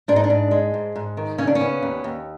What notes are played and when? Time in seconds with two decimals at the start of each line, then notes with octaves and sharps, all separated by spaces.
0.08 G#2 D4
0.16 D#4
0.24 D4
0.30 G#2
0.51 G#3
0.74 G#2
0.96 G#2
1.17 D#3
1.38 C#3 C#4
1.47 D4
1.55 C#4
1.61 B3
1.83 D#2
2.04 D#2